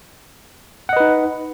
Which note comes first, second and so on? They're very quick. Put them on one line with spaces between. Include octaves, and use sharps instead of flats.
F#5 D#5 B4 D#4